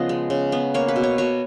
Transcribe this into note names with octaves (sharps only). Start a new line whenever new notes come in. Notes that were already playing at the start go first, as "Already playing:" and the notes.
Already playing: C#3 F3 B3 D#5
G#3
C#3
B3
A#3 C#5
B4
B2
C#5
B2 C#5